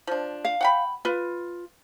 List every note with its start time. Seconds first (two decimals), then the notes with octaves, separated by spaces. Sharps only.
0.07 F3 D4
0.45 F5
0.61 F#5 G5 B5
1.05 F4 B4